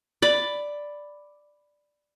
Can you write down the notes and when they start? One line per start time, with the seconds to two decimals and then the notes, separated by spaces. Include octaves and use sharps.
0.22 D5 B5